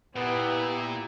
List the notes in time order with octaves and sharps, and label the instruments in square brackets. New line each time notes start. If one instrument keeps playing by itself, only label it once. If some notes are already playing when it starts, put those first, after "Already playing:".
[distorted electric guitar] A#2 [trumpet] B3 [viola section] E4 G4